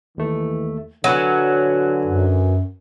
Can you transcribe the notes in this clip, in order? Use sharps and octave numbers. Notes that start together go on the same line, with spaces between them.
D#2 E3 A3
D3 F#3 F#4 B4 G#5
F#2